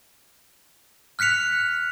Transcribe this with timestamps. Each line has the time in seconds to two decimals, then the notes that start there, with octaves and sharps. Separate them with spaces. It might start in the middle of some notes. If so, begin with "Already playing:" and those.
1.19 F6 F#6 B6 C#7 F7